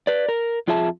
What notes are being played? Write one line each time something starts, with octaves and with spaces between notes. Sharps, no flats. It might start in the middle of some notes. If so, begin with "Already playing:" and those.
B4 D5
A#4
F2 F4 G#4 E5 A5